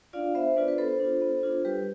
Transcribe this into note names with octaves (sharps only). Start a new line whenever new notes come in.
D4 F4 D5 F5
B3 C5 E5
D4 F4 B4 D5
B4
B3 A4 C5
D4 F4
B3
D4 F4
G3 G4 B4